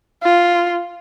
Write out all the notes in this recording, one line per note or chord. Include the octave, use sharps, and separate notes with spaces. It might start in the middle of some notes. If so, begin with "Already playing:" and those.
F4